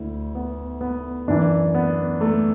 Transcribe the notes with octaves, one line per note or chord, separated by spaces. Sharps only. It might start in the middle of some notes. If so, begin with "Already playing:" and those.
Already playing: D2 D3 E4
B3
B3
F#2 E3 D4
B3
A3